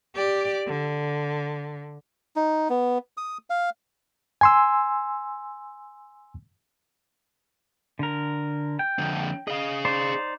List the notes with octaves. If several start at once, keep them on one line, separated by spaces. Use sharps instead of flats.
G4 D5
D3
D#4
B3
D#6
F5
G#5 C6 E6
D3 A#4
G5
F2 D3
G#4 D#5 F5
D#4 C5 D5